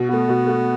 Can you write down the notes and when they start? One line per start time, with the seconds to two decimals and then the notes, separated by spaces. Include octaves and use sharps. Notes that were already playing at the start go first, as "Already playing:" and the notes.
Already playing: B2
0.09 A3 B3 F#4
0.29 B2
0.46 A3 F#4